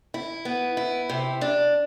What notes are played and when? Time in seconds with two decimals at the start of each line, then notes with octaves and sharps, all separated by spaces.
0.14 E4
0.45 B3
0.77 E4
1.10 C3
1.41 D4